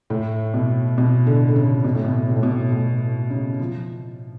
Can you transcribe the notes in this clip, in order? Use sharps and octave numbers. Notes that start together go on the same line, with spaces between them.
A2
B2
B2
D3
D3
C#3
B2
A2
B2
B2
A2
B2
A2
C#3
F3